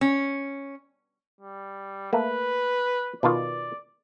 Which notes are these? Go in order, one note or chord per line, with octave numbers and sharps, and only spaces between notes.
C#4
G3
A3 A#3 B4
B2 D#3 F4 D5